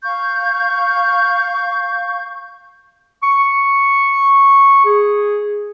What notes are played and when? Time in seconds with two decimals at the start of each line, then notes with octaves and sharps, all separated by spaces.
0.03 F5 C#6 G6
3.23 C#6
4.86 G#4